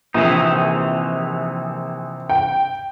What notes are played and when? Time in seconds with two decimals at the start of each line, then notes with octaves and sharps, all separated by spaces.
0.14 A#1 C3 E3 D#4
2.30 G5